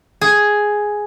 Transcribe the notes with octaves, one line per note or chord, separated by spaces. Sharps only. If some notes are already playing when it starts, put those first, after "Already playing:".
G#4